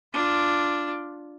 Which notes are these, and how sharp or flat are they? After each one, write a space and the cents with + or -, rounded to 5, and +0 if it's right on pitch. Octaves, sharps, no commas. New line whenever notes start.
D4 +0 F4 +0